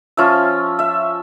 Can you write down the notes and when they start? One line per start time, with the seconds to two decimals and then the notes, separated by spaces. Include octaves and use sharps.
0.17 F3 C#4 F4 E5
0.79 E5